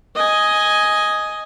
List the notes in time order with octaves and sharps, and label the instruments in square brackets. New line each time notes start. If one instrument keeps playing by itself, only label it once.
[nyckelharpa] D#5 G#5